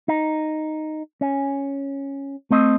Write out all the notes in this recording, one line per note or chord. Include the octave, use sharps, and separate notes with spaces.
D#4
C#4
A3 C4 D#5